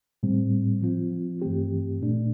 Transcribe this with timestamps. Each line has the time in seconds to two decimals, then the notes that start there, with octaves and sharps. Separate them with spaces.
0.23 A2 G3 C4
0.82 F3 C4 F4
1.42 G2 E3 A3 C4 G4
2.01 A#2 A3 D4